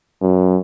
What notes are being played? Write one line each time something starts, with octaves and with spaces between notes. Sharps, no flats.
F#2